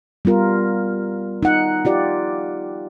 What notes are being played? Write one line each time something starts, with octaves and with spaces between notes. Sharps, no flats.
G3 B3 F4 A#4
D#4 F#5
F4 G4 D5